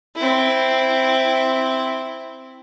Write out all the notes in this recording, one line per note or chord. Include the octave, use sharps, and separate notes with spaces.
C4 E4